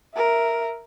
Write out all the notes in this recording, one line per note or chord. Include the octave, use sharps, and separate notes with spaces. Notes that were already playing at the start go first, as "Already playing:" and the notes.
A#4 E5